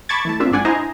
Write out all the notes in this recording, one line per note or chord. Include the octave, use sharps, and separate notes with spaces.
A5 B5 C#6 D6 G#6 A6
E3 A3 A5
A#3 C4 D4 F4 E5
G#1 F3 D4 D5 F#5 G#5
D4 E4 C5 D#5 G#5 A#5